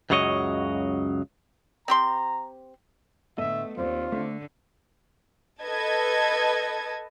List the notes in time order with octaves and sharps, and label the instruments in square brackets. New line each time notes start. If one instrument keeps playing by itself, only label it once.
[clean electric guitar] C#2 F#2 C#3 F#3 C#5 D#5
[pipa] C4 G4 C6 [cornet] A#5
[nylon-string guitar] A2 D3 [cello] A3 [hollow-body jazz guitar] B3 A4 D#5 [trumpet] E5
[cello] D#2 [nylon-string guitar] C4 D5 [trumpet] F4
[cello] D3 [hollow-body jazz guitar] A3
[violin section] A4 B4 D#5 A5 G#6